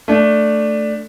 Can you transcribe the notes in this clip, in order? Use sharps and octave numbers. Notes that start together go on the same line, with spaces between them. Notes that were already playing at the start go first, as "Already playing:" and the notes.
A3 D4